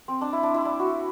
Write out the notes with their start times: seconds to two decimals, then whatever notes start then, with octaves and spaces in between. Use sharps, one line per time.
0.08 C4
0.21 D4
0.33 E4
0.43 D4
0.54 E4
0.65 D4
0.79 F#4